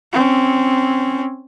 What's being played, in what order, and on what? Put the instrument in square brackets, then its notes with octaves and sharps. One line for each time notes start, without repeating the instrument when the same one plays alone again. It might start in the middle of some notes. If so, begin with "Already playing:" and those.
[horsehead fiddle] C4 C#4